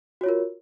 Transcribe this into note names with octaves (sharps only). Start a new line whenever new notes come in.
F4 F#4 A#4 C#5